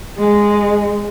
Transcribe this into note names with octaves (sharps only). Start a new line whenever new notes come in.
G#3